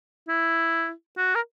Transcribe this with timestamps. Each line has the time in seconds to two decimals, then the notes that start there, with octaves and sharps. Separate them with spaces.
0.28 E4
1.17 F#4
1.35 A#4